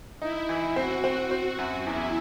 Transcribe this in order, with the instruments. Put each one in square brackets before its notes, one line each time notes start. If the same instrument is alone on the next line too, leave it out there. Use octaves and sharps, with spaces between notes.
[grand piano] D#4 [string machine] E4
[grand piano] E3
[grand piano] C4 [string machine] F#4
[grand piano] C4
C4
F#2
[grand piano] E2 [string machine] E4